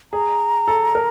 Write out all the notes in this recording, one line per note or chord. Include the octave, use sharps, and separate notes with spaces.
G#4 A#5
A4
A#4